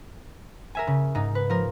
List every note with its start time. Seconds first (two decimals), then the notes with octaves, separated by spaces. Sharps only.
0.75 A#4 E5 G#5
0.87 C#3
1.15 G#2 D#4
1.35 B4
1.50 F3 A#4